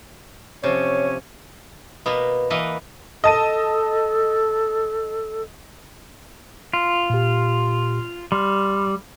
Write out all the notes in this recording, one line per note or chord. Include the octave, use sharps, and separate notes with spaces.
C3 F3 C#4 C#5
B2 A#3 B3
E3 A#3 B4 D#5 F#5
A4 D#5 A5 D#7
F4
A#2 G4
G3 C6 F6